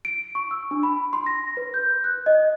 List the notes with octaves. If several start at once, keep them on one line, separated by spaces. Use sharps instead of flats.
D7
C#6
E6
D4
B5
C6
A#6
B4
G6
F#6
D#5